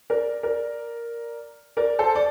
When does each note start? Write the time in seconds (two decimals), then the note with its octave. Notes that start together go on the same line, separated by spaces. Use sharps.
0.10 A#4 D5
0.43 A#4 D5
1.77 A#4 D5
1.99 A4 C5
2.15 D5